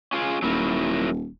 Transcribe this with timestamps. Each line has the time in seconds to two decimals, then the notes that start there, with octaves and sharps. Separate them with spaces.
0.13 C#4 F4 G#4
0.42 D#1 F#3 E4 A#4